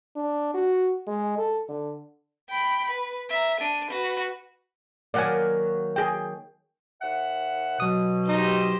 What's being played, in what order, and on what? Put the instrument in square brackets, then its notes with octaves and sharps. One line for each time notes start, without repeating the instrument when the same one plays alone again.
[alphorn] D4
F#4
G#3
A4
D3
[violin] G5 B5
B4
E5 A#5
D4 D#7
F#4 B4
[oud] D#3 F#3 A#3 [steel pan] D5 F#5 G#5
[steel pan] G#4 G5
[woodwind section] D#2 E5 F#5
[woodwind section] B2 [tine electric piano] F#3 D#6
[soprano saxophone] D#4 [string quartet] G4 C5 D#5